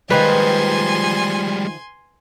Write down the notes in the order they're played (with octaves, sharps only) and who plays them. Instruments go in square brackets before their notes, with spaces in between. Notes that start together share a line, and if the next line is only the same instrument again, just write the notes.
[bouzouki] D3 D#3 F3 [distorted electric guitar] G3 G#3 [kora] B4 [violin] G#5 C6